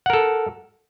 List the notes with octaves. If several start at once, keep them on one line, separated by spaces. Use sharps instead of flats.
A4 A#4 F#5